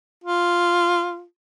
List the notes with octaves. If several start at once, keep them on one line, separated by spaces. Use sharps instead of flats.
F4